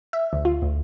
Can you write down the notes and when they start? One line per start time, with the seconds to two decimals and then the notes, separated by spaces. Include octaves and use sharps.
0.13 E5
0.33 D2
0.45 F4
0.62 D2